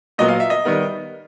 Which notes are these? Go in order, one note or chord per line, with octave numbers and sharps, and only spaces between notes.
A#2 F#3 B3 D#5
F5
E5
D#5
D#3 G3 B3